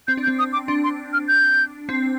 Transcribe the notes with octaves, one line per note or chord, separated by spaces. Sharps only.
C4 G6
D4
G6
C4
D#6
D6
D4 C6
C6
F6
G6
C4